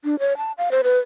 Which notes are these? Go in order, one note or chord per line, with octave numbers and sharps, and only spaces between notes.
D4
C#5
A5
F5
C5
B4